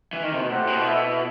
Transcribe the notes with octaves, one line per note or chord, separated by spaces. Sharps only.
E3
D#3
C3
B2
A2 E4 G4 C5 F#5
B2
E4 A4 E5